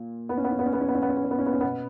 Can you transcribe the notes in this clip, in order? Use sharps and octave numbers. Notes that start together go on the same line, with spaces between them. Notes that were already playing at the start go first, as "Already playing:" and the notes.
Already playing: A#2
B3
C#4
B3
C#4
B3
C#4
B3
C#4
B3
C#4
B3
C#4
B3
C#4
B3
C#4
B3
C#4
B2 B3